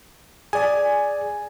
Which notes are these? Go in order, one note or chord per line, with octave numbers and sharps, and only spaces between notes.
G#4 D5 G#5